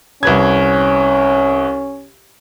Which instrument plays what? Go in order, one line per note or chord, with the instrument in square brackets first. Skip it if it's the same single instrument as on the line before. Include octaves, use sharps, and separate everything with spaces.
[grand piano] C2 B4 G#6 [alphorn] C#4